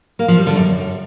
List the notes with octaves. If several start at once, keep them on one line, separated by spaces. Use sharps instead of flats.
A#3
F3
G3
D3
F#2